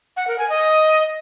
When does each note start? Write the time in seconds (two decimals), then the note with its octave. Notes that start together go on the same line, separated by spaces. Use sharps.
0.17 F#5
0.28 A#4
0.39 G#5
0.50 D#5